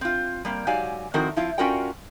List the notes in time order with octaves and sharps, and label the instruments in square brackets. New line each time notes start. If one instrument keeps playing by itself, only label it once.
[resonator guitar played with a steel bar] C4 F4
G3 A#3 C4
G#2 F#3 G4 D5 F5 G#5
D#3 F3 C4 E4 F#4 A#4
F3 C4 E4 F4
C#4 F4 F#4 A#4 D5 G5